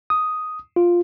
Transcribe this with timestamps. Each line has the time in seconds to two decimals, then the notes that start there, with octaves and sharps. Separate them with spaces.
0.10 D#6
0.76 F4